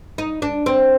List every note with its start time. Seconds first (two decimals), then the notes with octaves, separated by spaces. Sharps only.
0.18 D#4
0.42 D4
0.66 C4